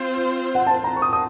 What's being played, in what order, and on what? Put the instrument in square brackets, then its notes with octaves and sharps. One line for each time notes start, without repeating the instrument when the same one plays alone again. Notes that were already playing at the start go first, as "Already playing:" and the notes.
Already playing: [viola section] C4 F4 C5
[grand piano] F#5
A5
A#5
C#6
D#6
D#6